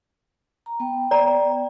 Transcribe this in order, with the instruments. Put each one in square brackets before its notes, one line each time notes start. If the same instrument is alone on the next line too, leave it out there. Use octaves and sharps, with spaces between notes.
[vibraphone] A#5
B3 G5
[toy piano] D5 A#5